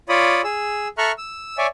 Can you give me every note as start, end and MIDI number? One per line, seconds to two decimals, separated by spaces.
0.09 0.42 65
0.09 0.42 73
0.09 0.42 74
0.09 0.42 83
0.09 0.42 87
0.44 0.88 68
0.44 0.88 88
0.98 1.12 69
0.98 1.12 76
0.98 1.12 82
0.98 1.12 85
0.98 1.12 89
0.98 1.12 90
1.18 1.57 88
1.58 1.67 73
1.58 1.67 74
1.58 1.67 76
1.58 1.67 80